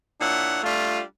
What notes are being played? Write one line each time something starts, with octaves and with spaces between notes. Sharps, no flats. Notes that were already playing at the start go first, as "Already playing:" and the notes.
A#2 D4 E4 C#5 F#5
G3 A3 D4 F4